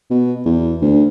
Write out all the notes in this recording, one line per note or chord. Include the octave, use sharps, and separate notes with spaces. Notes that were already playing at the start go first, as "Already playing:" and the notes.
B2
E2
D2